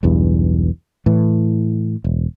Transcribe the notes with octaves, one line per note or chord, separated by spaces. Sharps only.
E1 B1 E2 G2
A2 E3
E1